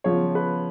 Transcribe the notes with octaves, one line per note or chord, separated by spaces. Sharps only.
C#3 F3 B3 F4 C#5
B4